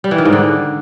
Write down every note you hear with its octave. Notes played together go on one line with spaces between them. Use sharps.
G3
E3
D#3
G#2
D3